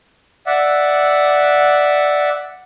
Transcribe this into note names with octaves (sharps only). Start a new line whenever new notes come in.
D5 E5 F#5